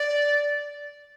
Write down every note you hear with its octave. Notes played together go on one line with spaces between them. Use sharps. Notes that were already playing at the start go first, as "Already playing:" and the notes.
Already playing: D5